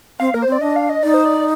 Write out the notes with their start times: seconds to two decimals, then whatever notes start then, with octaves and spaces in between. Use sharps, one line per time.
0.20 C4 F5
0.34 A#3 A#4
0.42 C5
0.47 C4 D5
0.61 D4 D#5
0.76 F5
0.89 D#5
1.03 D#4 D5
1.14 C5
1.25 D5